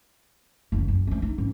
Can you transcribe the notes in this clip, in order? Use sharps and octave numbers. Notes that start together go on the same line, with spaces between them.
F#1 D2
F#2
A3 C#4
D#4
G#2 C#4